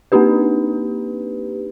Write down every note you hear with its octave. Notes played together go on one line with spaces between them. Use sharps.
A#3 C4 D4 D#4 G4 B4